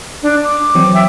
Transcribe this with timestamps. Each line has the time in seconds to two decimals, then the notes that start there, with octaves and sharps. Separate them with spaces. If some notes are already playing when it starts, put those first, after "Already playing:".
0.23 D4
0.44 D6
0.75 E3 F#3 C4
0.94 E5 G5